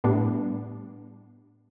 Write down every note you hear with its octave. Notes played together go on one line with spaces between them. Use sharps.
A2 G3 B3 D4